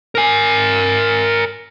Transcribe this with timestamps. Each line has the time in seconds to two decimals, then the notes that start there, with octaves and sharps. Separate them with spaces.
0.15 A#4 G#5